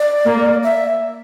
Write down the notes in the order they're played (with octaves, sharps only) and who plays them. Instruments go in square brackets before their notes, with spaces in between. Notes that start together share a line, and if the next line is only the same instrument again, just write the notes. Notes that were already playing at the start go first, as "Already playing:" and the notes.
Already playing: [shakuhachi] D5
[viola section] A#3
[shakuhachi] E5